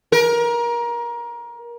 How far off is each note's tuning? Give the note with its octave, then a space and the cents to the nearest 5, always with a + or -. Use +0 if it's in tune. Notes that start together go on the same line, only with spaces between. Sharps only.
A#4 +25